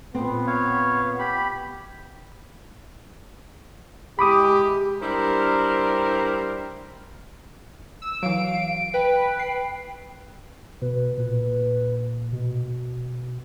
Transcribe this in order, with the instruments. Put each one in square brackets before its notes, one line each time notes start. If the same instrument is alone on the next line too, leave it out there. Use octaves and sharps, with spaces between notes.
[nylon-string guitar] A#2 C4 [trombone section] B3
[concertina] C#5 F5
G4 B5
[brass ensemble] G#3 E4 G4 [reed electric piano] B5 D6 D#6
[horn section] G3 D4 E4 A#4 C5
[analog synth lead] E6
[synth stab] E3 F#3 [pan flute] F5 [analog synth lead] D7
[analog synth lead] B4 [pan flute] G5
[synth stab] C7
[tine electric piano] B2 [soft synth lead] B4
[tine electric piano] A#2 [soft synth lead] B4
[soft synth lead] B2